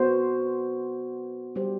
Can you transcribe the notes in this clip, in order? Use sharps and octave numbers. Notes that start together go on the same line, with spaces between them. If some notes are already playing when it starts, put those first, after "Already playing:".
Already playing: B3 F#4 C5
G3 D4 G4 C5